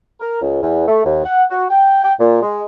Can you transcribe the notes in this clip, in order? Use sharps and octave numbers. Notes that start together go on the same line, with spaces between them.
A#4
C#2
E2
A3
D#2
F#5
F#4
G5
G5
A#2
G#3